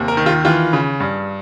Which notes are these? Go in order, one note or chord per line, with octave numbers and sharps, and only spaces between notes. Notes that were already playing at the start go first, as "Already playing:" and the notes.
Already playing: D#2 C3
A#4
D#3
F4
E3 F4
C#3
G2